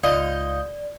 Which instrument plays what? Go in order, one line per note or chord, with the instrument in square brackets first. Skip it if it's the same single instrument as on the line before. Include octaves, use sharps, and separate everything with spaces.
[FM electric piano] C#2 F4 G6 [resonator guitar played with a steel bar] G#2 F5 [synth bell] D5 [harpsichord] D#5